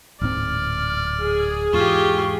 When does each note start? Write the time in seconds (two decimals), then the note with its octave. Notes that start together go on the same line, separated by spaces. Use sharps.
0.21 D1 G#2 C4 D5 F6
1.23 G#4
1.73 E2 G#2 F4 G4 C#6